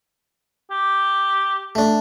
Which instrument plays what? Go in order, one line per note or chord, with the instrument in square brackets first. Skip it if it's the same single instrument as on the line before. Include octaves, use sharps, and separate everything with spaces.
[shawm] G4
[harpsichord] A3 D4